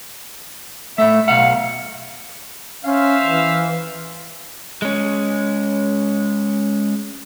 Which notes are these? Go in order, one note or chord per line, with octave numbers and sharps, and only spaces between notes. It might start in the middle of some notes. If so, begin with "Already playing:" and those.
A2 A3 E5
B1 F5 F#5
C#4 C5 E5 F5
E3
G#3 C#4